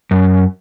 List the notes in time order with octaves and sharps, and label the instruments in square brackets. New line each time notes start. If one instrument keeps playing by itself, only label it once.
[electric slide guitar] F#2